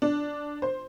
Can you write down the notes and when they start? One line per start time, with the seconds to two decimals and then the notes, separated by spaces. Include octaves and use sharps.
0.02 D4
0.62 C5